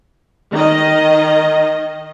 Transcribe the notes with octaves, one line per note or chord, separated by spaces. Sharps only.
D#3 D#5